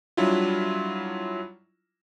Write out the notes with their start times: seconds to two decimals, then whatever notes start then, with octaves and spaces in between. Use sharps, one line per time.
0.17 F#3 G3 D4 E4 F4